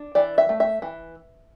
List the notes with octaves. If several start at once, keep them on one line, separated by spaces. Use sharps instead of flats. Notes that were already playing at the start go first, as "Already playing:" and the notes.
Already playing: D4
E3 D5
E5
A3
E5
E3